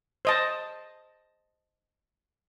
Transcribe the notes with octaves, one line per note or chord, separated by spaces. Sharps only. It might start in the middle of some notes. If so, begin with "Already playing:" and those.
C5 D#5 A5